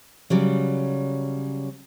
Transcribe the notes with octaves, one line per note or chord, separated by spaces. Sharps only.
C#3 F#3 G3